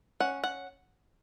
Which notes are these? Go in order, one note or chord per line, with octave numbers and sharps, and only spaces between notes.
C#4 F#5
F#5